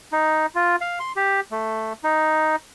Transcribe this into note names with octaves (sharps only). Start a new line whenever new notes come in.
D#4
F4
F5
C6
G4
A3
D#4